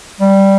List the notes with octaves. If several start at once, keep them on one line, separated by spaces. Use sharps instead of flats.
G3